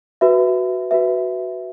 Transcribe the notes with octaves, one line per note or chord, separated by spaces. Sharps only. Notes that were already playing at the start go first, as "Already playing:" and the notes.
F#4 B4 E5
F#4 B4 E5